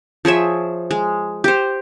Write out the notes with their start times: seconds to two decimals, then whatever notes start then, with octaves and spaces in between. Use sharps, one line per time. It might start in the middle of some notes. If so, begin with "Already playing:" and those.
0.25 F3 G#4 C#5 E5
0.91 G#3
1.44 G4 C5